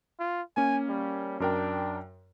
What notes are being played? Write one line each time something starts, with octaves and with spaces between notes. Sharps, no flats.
F4
A#3 C#4 G#5
G3
F#2 D4 A#4 G5